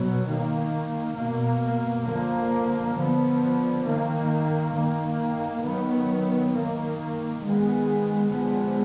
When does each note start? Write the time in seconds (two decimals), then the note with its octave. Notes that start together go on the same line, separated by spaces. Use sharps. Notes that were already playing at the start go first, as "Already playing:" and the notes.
Already playing: B2 F#3 B3
0.27 D#3 A#3
1.16 B2 A#3
2.05 D3 F3 A#3
2.95 D3 F3 B3
3.83 D#3 A#3
4.72 D#3 A#3
5.62 D#3 F#3 B3
6.51 D#3 A#3
7.41 D#3 G#3 B3
8.29 D3 F3 G#3 B3